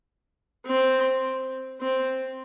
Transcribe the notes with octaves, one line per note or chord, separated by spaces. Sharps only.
C4
C4